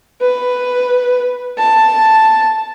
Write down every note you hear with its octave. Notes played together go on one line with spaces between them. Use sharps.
B4
A5